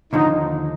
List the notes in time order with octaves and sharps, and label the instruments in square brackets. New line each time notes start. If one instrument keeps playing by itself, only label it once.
[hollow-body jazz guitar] D#2 D3 F3 [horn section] D#4